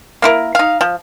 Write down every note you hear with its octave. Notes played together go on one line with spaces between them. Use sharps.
A#3 E4 A#4
D#4 F5
F3